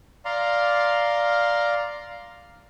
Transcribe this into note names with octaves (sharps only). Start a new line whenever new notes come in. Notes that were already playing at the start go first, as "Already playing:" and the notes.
D5 F5 A#5 C6